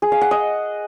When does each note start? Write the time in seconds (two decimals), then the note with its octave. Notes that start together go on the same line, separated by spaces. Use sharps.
0.02 G#4
0.12 F5
0.21 F#5
0.31 D#5